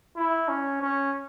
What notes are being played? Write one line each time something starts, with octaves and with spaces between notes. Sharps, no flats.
E4
C#4
C#4